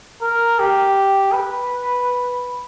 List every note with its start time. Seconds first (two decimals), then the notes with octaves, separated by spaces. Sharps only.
0.22 A#4
0.59 G4
1.33 B4